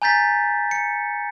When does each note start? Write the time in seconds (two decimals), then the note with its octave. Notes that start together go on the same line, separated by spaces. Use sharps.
0.02 G#5 A#5 G6 A6 B6
0.71 C#7